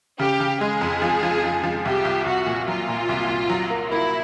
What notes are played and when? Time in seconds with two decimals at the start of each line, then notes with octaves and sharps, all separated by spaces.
0.19 C#3 G4
0.40 C#3
0.61 G#3 G#4
0.81 F2
1.02 F3
1.23 F3
1.44 F3
1.64 F3
1.85 C2 G4
2.05 C2
2.26 C2 F#4
2.46 A#2
2.68 F#3 F4
2.89 A#2
3.09 C2
3.29 C2
3.50 F#3
3.70 A#3
3.91 A#3 E4